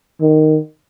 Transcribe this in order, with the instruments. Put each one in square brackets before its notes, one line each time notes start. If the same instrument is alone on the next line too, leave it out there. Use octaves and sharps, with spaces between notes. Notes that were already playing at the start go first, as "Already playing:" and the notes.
[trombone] D#3